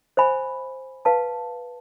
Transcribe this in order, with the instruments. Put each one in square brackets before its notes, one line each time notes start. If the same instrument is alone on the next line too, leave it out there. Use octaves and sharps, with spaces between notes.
[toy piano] C5 E5 G#5 B5
B4 F5 A5